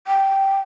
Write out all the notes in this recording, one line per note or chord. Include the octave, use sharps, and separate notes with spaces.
G5